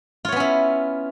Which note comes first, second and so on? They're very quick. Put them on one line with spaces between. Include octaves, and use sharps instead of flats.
F4 C#5 B3 C#4 E4